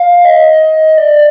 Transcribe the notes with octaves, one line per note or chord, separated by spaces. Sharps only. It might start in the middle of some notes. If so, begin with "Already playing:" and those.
Already playing: F5
D#5
D5